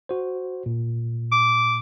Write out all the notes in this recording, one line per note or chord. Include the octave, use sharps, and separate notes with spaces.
F#4 C5
A#2
D6